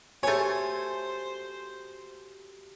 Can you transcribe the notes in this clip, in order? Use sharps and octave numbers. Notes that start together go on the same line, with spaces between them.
A3 F#4 G4 A4 C5 C#5 G#5